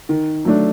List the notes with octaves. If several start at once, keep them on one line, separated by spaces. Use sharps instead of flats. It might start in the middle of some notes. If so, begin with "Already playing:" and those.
D#3
F#3 A3 D4